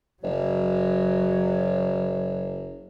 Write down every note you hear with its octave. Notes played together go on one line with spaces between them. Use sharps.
F#1 F#3